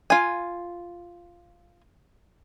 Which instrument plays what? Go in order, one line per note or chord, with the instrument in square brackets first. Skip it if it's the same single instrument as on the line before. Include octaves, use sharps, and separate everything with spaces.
[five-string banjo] F4 G#5